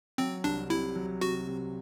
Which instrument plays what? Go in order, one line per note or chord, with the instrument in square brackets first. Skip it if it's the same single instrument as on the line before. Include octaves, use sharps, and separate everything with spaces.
[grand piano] F#3 [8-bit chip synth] C4
[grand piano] C2 [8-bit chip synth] D4
[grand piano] C3 [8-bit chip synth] E4
[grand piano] F#3
[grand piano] C3 [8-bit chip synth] F#4
[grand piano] C3